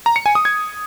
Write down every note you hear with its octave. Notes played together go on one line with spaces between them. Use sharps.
A#5
C#7
G#5
D#6
G#6